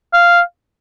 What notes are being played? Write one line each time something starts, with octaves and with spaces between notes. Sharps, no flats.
F5